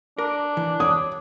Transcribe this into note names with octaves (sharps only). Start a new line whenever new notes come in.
D4 A#4
E3
C#5 D#6